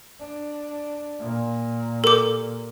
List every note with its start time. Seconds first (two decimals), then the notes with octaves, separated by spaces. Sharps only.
0.19 D4
1.19 A#2
2.04 G4 A4 A#4 D6